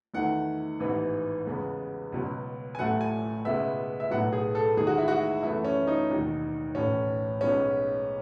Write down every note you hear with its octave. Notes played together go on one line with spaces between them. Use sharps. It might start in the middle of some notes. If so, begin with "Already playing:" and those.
E2 D#3 A3 F#5
A1 G#2 E3 B3
E2 C#3 G#3 B3
C#2 B2 F#3
G#5
A1 A2 F#3 A3 F#5
G#5
C#2 B2 G#3 B3 E5
E5
B1 A2 F#3 B3 F#5
G#4
A4
E2 D#3 G#3 G#4
F#4
E4
F#4
F#2 E3 A3 E4
C#4
D#4
E1 D#2 D#3 F#3
B1 A2 E3 C#4
B1 B2 G#3 C#4